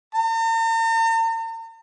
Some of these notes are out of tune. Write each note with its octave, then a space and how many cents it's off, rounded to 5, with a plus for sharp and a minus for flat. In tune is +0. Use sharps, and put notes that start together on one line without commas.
A#5 -45